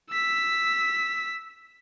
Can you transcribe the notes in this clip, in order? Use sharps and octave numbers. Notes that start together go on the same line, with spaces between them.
E6 B6